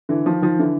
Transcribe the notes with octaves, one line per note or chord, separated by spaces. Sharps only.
D3 E3
D#3 F3
D#3 F3
D3 E3